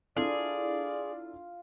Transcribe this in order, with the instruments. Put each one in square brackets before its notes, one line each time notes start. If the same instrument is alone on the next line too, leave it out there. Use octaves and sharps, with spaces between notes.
[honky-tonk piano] D4 E4 A4 [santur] F4 [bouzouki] G#4 [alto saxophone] D5